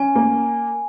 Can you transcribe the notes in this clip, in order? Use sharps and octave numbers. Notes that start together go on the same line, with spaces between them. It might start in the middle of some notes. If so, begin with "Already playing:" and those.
Already playing: C#4 G#5
A#3